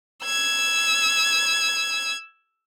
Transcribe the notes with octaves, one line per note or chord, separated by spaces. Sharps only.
E6 G#6